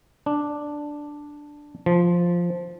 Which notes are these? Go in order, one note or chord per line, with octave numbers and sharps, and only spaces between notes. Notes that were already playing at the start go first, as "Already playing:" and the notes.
D4
F3